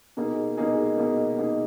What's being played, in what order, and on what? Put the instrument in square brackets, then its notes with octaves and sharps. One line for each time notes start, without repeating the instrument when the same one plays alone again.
[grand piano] B2 A#3 D#4 G#4
B2 A#3 D#4 G#4
B2 A#3 D#4 G#4
B2 A#3 D#4 G#4